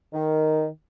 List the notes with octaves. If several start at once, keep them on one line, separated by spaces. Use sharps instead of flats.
D#3